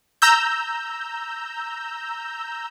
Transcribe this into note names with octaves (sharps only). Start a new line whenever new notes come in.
A#5 E6 G6